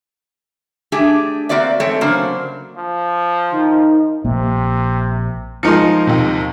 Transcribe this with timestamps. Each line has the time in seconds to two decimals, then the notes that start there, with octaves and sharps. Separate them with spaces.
0.92 A3 D4 G4 G#4
1.49 A#3 C4 F#4 D5 E5
1.80 G#2 A3 C4 A4 C#5
2.01 C#3 F#3 A#3 D4 C5
2.77 F3
3.50 D#3
4.24 A#1 C3 A#3
5.63 F3 G#3 D#4 A#4 C6 C#7
6.07 D#2 C3